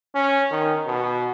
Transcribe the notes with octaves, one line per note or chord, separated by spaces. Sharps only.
C#4
D#3
B2